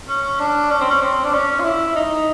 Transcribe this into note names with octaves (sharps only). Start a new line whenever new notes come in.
C#4
D4
C#4
C4
C#4
C4
D4
C#4
F4
E4
D#4